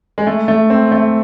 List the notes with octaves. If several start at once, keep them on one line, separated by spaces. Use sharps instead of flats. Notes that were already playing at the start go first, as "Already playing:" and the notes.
G#3
A3
A3
C4
A3